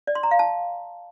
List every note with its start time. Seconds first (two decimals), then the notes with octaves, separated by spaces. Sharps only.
0.07 D5
0.15 C6
0.23 A#5
0.31 F5
0.39 A5